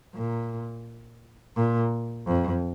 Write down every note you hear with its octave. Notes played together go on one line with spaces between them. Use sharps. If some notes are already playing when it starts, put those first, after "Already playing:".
A#2
A#2
F2